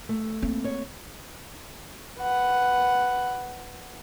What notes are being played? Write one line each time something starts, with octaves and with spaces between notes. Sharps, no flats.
A3
A#3 C4
C#5
B4 F#5